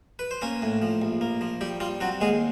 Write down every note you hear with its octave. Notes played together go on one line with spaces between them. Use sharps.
B4
C5
A#3 C#4 C#5
A2
F3
A#1
A#3
F3
G3 G4
G3 F4
F#3 C4 F#4
D#2 G#3 G#4